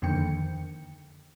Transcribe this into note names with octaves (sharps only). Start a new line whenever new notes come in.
F2 D3 D#3 A#3 G5 C#7